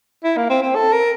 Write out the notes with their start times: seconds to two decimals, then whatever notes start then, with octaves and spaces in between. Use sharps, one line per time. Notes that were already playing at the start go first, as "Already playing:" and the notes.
0.24 E4
0.37 A#3
0.50 C4
0.62 C4
0.75 A4
0.93 A#4